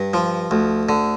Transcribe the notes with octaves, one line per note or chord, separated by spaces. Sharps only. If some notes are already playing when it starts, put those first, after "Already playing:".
Already playing: G2
F3
D2
D3